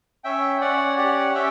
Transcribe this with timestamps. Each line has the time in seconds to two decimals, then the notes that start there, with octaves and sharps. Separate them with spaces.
0.24 C#4 E5 G5
0.61 C#4 D5 F#5
0.98 G4 D5 F#5
1.34 C#4 E5 G5